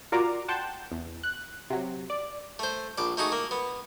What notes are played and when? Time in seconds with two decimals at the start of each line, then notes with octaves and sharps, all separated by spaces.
0.12 F4 F#4 A#4 D5 A#5 D6
0.48 F#5 G5 A5 C6 G6
0.92 E2
1.23 F#6
1.70 C3 F#3
2.10 D5
2.59 A3 C5
2.98 A#1 D5
3.17 A3 D#4 F#4 G#4
3.32 A#3
3.51 B3